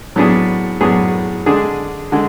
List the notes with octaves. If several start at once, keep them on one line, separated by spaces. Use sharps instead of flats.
A2 F#3 B3 D4 G#4
A2 F#3 B3 D4 G#4
D3 G#3 D4 G#4
D3 G#3